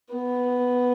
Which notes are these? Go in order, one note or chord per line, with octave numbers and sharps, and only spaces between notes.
B3